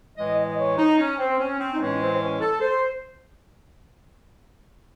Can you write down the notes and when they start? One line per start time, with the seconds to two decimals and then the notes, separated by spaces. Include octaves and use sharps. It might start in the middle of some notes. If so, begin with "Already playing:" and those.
0.17 A2 E3 G#3 D#5
0.37 D#5
0.47 D#5
0.57 C#5
0.78 D#4
0.99 C#4
1.18 C4
1.39 C#4
1.59 C4
1.73 D#4
1.80 A2 E3 G#3 C#4
2.00 C4
2.14 C4
2.21 C#4
2.40 A4
2.61 C5